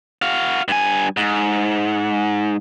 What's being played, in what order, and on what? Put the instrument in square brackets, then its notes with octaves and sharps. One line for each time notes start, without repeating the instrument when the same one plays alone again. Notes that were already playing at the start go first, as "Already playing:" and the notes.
[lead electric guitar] F#4 F5
G2 G#5
G#2